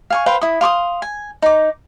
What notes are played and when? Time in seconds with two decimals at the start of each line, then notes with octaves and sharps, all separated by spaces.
0.10 F5 G#5 C#6
0.26 B4 C5 F5 G5
0.41 E4 D#6
0.61 F5 C6 D6 D#6
1.02 G#5
1.42 D#4 D6